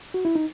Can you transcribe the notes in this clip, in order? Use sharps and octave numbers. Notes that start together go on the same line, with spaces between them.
F#4
E4
D#4